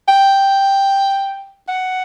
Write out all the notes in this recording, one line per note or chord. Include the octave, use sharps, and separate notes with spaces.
G5
F#5